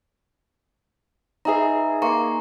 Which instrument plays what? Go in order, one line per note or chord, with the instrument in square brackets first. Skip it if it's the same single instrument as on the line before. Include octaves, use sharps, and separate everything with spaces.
[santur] D#4 G#4 [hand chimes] B4 E5 A#5
[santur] A#3 C6 [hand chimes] A#5 C#6